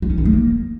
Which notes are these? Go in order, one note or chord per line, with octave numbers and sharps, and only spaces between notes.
F4
C#4
D#3
G#3
A#3